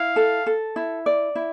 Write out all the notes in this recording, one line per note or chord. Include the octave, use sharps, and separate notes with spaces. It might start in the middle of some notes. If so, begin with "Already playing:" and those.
Already playing: E4 F5
A4
A4
E4
D5
E4